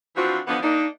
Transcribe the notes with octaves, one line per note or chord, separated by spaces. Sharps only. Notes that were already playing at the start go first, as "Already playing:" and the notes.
E3 F3 C4 D4 F4 F#4
D3 E3 F3 B3
A#3 D4 D#4